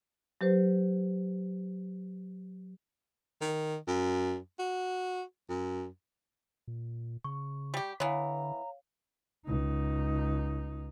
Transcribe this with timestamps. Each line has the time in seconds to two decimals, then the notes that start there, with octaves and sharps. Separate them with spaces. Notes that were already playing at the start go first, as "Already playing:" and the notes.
0.41 F#3 G4 B4 C5
3.41 D#3
3.88 F#2
4.59 F#4
5.50 F#2
6.68 A#2
7.24 C#3 C#6
7.74 G3 G4 G5
8.00 D3 E3 B3 C#5 F5 A#5
9.46 C#2 D#4